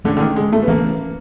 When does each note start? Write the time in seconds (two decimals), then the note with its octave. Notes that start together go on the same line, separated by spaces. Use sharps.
0.04 D3 E3 A3 C#4
0.17 D3
0.20 D#3
0.36 G#3
0.52 A3
0.63 B3
0.67 E3 A3 A#3 C#4